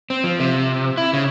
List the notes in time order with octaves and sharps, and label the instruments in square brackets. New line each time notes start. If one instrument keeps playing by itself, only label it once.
[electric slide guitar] C4
F3
C3
E4
C#3